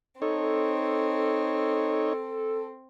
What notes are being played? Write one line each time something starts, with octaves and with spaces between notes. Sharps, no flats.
C4 D#4 A4 C#5